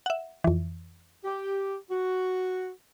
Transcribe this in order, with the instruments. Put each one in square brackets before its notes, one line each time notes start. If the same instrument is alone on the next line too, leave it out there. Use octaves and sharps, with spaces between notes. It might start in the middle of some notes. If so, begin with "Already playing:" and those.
[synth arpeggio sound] E5 F#5
F2 E3
[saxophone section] G4
F#4